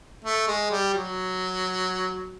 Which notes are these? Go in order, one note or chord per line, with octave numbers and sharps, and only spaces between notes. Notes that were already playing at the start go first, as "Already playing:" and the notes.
A3
G#3
G3
F#3